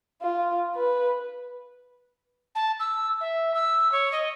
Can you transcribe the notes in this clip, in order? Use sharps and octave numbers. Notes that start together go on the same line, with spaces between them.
F4
B4
A5
E6
E5
E6
C#5
D#5